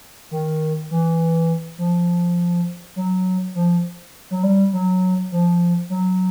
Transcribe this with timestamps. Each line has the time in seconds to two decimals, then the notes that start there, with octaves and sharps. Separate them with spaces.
0.31 D#3
0.91 E3
1.78 F3
2.96 F#3
3.55 F3
4.30 F#3
4.43 G3
4.73 F#3
5.32 F3
5.90 F#3